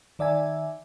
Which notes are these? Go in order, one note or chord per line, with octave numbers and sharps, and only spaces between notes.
D#3 D5 E5 G#5